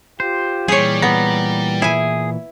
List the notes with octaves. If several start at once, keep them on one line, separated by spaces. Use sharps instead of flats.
F4 G4 C5
A#2 E3 G3 G#4 C#5
B3 A#5
E4 G#4 G#5